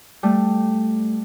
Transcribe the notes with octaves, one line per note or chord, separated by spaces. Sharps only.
G3 A3